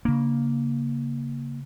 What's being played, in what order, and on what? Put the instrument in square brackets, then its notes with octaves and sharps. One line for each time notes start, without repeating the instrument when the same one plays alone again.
[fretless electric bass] C#3 D4 [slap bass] A#3